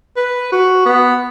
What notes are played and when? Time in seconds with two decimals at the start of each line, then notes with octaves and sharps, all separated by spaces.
0.16 B4
0.52 F#4
0.86 B3